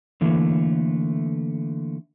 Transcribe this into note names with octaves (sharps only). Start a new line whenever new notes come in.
D3 E3 A3 A#3